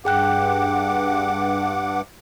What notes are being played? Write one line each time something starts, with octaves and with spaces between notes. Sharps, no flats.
G2 G#4 F#5 G5 D6 F#6